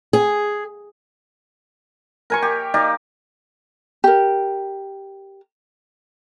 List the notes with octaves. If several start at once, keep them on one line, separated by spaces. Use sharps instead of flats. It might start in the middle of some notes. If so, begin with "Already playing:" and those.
G#4
A#4 G#5 C#6
G4
D#4 G4 D5 F5
G4 A#4